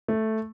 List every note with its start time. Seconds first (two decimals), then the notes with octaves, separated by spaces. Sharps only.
0.08 A3